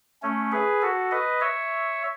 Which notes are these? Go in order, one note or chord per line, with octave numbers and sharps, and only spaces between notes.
A3 C#4
G#4 B4
F#4 A4
B4 D#5
C#5 E5